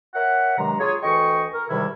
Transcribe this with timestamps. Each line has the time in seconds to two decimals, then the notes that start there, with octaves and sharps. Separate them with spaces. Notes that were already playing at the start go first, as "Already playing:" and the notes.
0.14 A#4 C#5 E5 F#5
0.57 G2 C3 D#3 F#3 G#3 A#5
0.79 F4 G#4 C#5
1.02 D2 E3 D#5 G5 C#6
1.53 A#4
1.70 G#2 C3 D#3 E3 G3 E4